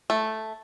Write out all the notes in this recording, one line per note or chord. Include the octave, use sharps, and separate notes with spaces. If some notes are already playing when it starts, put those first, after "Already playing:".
A3